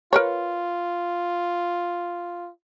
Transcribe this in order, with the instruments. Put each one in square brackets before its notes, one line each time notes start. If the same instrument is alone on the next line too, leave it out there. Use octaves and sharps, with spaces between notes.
[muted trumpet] F4 [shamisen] A#4 B4 C#5